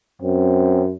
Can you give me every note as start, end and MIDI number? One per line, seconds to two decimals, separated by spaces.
0.22 0.95 42
0.22 0.83 60